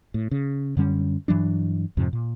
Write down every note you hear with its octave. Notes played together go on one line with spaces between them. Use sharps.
A2
C#3
F#2 D3 G3 C#4
G2 E3 F#3 D4
F2 G#2 C3 F3
A#2